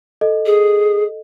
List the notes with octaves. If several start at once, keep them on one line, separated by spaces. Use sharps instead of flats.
A4 D#5
G#4